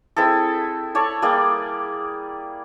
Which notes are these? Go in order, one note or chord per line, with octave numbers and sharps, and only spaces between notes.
C4 E4 G#4 A4
A4 C#5 D5 A5
G3 A#3 G#4 D5